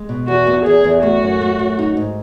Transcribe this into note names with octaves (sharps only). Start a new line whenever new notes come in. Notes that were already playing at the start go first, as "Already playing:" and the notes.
Already playing: G#3
B2
E2 F#4
B3
E2 G#4
E2
A3 F#4
F#2
A3
F#2
D#4
G#2